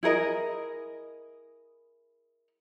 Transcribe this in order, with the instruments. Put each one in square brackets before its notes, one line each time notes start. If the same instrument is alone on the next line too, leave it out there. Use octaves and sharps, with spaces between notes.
[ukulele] E4 G#4 A#4 D#5